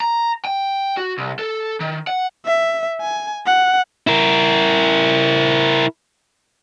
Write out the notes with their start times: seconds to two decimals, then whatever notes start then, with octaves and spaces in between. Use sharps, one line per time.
0.01 A#5
0.45 G5
0.97 F#4
1.18 C2
1.39 A4
1.80 D#3
2.07 F#5
2.46 E5
3.01 G#5
3.47 F#5
4.07 E4 A#4